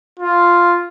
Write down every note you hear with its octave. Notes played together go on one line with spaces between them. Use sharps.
F4